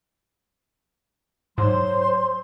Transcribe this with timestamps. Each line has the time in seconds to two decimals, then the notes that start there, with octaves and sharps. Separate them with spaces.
1.58 G#2 F#3 C5 C6